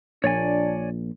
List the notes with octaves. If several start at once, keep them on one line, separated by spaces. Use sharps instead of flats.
A#1 A#2 D4 C#5 D5 G#5